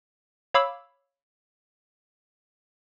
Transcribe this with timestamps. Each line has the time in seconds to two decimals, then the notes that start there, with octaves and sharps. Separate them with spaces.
0.54 C#5 F5 B5 D6 E6